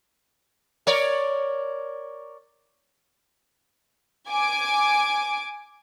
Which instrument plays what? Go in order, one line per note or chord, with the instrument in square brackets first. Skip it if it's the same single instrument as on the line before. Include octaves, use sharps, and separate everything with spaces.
[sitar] A#4 C#5 D5
[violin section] G#5 D6